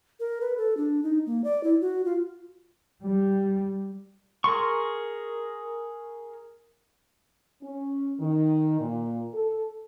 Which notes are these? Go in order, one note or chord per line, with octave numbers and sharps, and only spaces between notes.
A#4
B4
A4
D4
D#4
A#3
D5
E4
F#4
F4
G3
G#4 A#4 C6 C#6
C#4
D#3
A#2
A4